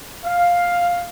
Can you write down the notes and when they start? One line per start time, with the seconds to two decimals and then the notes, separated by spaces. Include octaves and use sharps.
0.24 F5